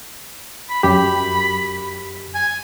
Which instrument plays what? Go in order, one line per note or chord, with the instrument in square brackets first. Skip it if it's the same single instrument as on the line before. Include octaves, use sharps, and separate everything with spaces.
[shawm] B5
[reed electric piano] F#2 G4 [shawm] B5
[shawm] G#5